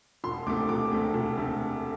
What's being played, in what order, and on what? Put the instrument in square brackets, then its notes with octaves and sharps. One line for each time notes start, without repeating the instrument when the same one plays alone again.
[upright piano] E1 C6
D2 C3 A3 D6
E1 D6
D2 C3 A3
E1
D2 C3 A3